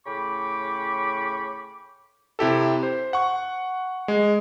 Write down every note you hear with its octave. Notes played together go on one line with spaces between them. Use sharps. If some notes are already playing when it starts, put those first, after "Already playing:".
A2 C#3 G5 B5 C#6 D6
C3 E4 G4 A4
C5
F#5 C#6
G#3